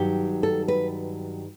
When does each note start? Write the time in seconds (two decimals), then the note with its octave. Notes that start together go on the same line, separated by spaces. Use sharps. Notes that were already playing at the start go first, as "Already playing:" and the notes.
Already playing: G2 D#3 F#3 G4
0.43 A4
0.68 B4